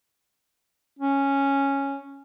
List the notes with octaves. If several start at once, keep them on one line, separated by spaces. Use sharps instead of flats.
C#4